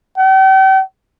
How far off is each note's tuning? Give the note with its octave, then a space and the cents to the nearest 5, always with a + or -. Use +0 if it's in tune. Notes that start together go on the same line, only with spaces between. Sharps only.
G5 -40